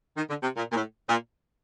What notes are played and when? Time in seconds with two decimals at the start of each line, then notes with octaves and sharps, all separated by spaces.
0.17 D#3
0.29 D3
0.43 C3
0.57 A#2
0.72 A#2
0.76 A2
1.09 A#2